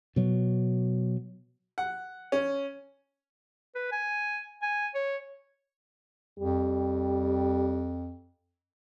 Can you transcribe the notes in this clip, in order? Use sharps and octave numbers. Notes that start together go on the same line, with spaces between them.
B2 F#3
F#5
C#4
B4
G#5
G#5
C#5
F2 G3